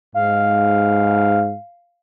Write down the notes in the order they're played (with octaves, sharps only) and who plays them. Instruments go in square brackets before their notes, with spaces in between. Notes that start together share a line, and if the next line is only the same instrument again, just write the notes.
[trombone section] G#2 [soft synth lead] F5